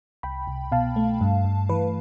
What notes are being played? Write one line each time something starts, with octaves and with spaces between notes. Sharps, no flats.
C2 G5 B5
C2
B2 F5 A5
A3
G2
G2
E3 B4